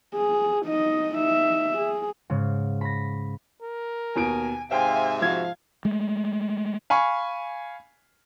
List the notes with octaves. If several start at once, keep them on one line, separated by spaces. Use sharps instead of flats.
G#4
D#4 D#5
D#4 E5
G#4
G#2 C#3
B5 A#6
A#4
D#2 B2 G#5 D7
G#2 C3 C5 E5 F5 G5 G#5
F3 F#4 F5 G#6
G#3 A3
F5 G#5 B5 C#6